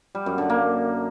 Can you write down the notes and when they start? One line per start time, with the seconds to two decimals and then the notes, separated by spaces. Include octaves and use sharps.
0.15 G3
0.26 F#2
0.38 D3
0.50 A#3